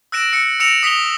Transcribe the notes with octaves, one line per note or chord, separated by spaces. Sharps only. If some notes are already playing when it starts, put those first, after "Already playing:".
E6 F#6 A#6 D7 E7
E6 C#7
E6 A#6 C#7 D7 E7 F7
D#6 B6 C7 F7 G7